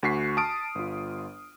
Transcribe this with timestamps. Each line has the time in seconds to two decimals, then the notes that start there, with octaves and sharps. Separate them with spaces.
0.03 D2 F#4 C#6 B6 C7
0.37 A5 D#6 F6 D7
0.75 G1 F4